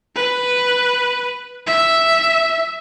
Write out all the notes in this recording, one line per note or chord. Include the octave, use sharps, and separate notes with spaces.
B4
E5